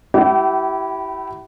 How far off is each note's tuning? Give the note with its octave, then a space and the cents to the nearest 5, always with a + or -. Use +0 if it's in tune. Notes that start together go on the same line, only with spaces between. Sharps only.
E4 +0 G4 -30 F#5 +45